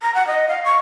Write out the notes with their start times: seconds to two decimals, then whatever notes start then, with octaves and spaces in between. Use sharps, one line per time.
0.02 A#5
0.14 F#5
0.27 D#5
0.48 F5
0.64 C#6